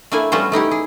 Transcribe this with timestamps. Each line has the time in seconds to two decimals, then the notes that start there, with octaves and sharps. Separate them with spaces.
0.12 A3 A#3 D4 E4 G#5
0.32 G3 B3 C#4 F4 F#4 C5
0.52 A3 D#4 E4 G4
0.71 G#4